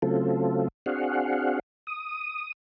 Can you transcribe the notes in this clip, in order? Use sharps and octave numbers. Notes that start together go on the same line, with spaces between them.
C#3 F#3 A3 C4 F4 A4
C4 D4 F#4 G#4 F5 F#5
D#6